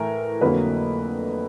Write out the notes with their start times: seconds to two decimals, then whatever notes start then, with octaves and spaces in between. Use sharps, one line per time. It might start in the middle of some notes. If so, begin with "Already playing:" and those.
Already playing: A2 E3 A3 A#4
0.41 F2 D3 F#3 A#3 B4